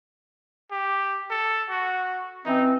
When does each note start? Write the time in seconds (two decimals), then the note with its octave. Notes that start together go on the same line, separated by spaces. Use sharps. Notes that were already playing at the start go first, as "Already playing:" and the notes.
0.71 G4
1.30 A4
1.70 F#4
2.46 E3 C4 C#4 D#4